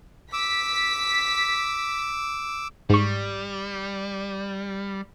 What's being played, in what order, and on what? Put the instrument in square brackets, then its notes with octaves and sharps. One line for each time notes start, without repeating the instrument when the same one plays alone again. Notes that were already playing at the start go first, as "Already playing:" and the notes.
[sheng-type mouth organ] D6 E6 [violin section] B6
[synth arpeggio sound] G#2 C#6 [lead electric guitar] G3